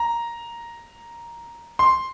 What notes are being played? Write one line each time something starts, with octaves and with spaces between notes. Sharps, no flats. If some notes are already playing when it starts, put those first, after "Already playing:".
Already playing: A#5
C6